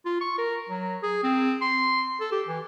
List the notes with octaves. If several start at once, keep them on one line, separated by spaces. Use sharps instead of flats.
F4
C#6
A#4
F#3
G#4
C4
C6
A4
G4
E3